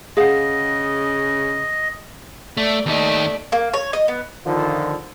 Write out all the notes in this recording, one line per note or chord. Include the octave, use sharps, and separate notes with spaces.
C#3 G#4 D#5 F5 F#5
A3 D5
D#2 A3 D#4 D5
A#3
C#5
D#5
B3
D3 D#3 F3 F4